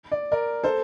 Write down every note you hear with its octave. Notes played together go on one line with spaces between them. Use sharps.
D5
A#4 D5
A4 C5